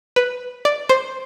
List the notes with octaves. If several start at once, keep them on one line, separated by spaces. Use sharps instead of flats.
B4
D5
C5